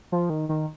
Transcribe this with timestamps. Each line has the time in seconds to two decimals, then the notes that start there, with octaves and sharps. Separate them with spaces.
0.12 F3
0.30 D#3
0.49 D#3